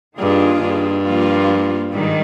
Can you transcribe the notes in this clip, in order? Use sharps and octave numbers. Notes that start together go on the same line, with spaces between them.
G2 D#3 A#3 D4 F4 G#4
G2
F3 A#3 F4
G#2 D#3 G3